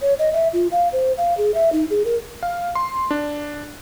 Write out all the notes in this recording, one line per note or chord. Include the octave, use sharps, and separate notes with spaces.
C#5
D#5
E5
F4
F5
C5
F5
G#4
E5
D#4
G#4
A#4
F5
C6
D4